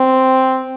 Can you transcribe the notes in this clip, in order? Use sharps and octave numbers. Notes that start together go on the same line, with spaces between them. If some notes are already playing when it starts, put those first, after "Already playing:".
Already playing: C4